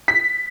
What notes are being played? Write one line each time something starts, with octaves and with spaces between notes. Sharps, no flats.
B6